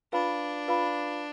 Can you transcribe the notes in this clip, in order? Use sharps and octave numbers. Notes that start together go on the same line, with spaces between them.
D4 F4 B4 F5 B5
F4 B4 F5 B5